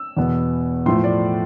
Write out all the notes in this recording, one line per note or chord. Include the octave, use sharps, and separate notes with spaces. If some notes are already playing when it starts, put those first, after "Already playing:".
Already playing: E6
E2 B2 B3
A2 F3 A3 C6
D5